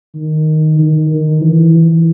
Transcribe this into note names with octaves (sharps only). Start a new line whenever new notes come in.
D#3
D#3
D#3
E3
E3